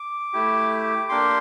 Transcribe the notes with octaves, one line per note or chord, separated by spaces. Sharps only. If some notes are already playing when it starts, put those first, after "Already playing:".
Already playing: D6
A3 E4 G4
A#3 D4 G4 C6